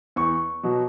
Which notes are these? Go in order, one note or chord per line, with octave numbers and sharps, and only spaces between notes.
E2 C#6
B2 F#3